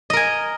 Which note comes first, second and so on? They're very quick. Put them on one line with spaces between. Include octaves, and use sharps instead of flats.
D#5 A#4 G#5